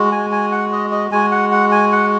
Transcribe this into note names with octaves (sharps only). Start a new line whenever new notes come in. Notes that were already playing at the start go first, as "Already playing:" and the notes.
Already playing: G#3 F#4
G#5
G#5
F#5
D#5
D#5
G#3 F#4 G#5
F#5
F#5
G#5
F#5